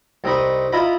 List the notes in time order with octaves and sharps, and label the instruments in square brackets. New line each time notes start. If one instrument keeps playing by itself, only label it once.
[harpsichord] C2 C4 D#4 D#5 B5 C#6
E4 F4 D#5 A#5 B5